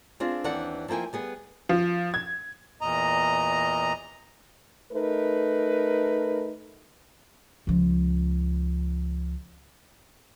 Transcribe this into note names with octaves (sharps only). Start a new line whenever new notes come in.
C4 D4 F4 G#4
D#2 E3 C4 D4 F#5
F3 A#3 E4 G5 G#5
G3 B3 G#4
F3
G#6
E2 A#2 D#5 A#5
A3 D#4 A#4 B4
C#2 F3